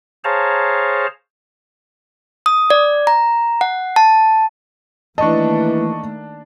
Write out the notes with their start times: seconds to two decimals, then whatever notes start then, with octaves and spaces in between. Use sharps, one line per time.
0.24 G#4 C5 C#5 F5 A5 A#5
2.46 D#6
2.70 D5
3.07 A#5
3.61 F#5
3.96 A5
5.18 D#3 E3 A3 A#3 D4 D#5 A5 C#6